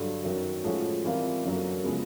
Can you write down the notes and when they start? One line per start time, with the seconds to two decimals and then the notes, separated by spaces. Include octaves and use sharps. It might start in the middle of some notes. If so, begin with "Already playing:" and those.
Already playing: G2 D3 F#3
0.24 F#2 D#3 F#3
0.64 A2 F3 G#3 C#4 F#4
1.04 E3 G3 C4 F4 A#4
1.44 F#2 D3 F#3 A#3
1.84 C#3 F3 G#3 B3